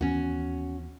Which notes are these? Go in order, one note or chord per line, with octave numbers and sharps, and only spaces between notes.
D#2 E3 B3 C#4 F#4